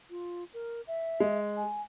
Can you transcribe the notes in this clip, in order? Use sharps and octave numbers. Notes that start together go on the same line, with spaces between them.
F4
A#4
E5
G#3
G#5